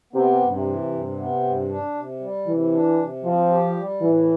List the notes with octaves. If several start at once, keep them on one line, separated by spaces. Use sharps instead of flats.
C3 B3
G2
C3
E3
G2
B3
G2
D4
C3
G3
C3 E3
D4
C3
F3 C4
G4
G3
A2 E3